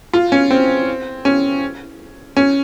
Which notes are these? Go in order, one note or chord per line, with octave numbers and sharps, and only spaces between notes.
F4
C#4
C4
C#4
C#4